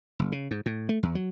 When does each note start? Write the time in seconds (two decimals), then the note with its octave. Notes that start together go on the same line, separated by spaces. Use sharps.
0.19 F#1
0.32 C#3
0.51 G#2
0.66 A2
0.89 A3
1.03 E2
1.15 F#3